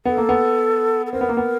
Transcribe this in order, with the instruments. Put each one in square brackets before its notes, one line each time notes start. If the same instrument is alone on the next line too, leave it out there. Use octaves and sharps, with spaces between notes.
[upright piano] B3 [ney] A4
[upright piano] A#3
B3
[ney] A4
[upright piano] C4 [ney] A#4
[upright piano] B3
A#3
B3